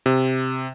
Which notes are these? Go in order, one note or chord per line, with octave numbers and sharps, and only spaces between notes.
C3